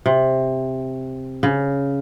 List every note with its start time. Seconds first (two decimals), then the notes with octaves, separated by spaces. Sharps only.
0.06 C3
1.43 C#3